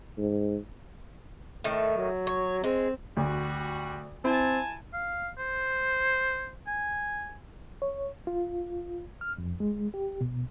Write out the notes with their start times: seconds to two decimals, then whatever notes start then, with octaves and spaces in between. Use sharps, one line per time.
0.18 G#2
1.64 A2 D#3 A3
1.97 F#3
2.27 C#5
2.64 G#3 C4
3.17 D2 G3 F#4
4.25 C4 E4 G#5 A5
4.93 F5
5.38 C5
6.67 G#5
7.82 C#5
8.27 F4
9.21 F6
9.38 F2
9.60 G#3
9.94 G4
10.21 B2